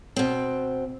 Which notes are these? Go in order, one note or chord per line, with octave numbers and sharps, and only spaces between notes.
B2 C4